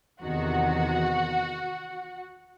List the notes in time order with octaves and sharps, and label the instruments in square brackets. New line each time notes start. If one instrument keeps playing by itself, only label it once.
[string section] E2 C3 D#3 F#4 F#5